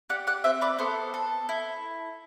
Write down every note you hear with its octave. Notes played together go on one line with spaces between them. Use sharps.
G4 D5 F#5
D5 F#5
C4 C5 E5
B4 D5
B3 A4 C5
A4
E4